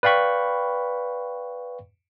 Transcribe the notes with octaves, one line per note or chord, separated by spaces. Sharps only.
B4 D5 F5 G5 B5 C#6